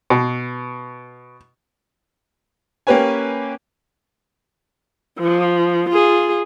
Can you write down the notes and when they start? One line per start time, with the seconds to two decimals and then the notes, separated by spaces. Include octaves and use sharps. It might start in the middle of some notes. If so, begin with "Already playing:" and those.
0.10 B2
2.87 A#3 C#4 G4 B4 C#5 G#5
5.19 F3
5.89 F4 G#4